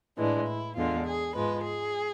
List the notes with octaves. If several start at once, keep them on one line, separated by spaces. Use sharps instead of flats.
A2 E3 G#3 D4
E4
E2 D3 G#3 F4
G#4
G#2 F3 G#3 B4
G#4